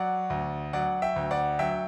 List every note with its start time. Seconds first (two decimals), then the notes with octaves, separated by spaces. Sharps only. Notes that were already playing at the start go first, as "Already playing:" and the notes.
Already playing: F#3 D5 F#5
0.30 D2
0.73 F#3 D5 F#5
1.02 E5 G5
1.16 D2
1.31 D5 F#5
1.59 F#3 E5 G5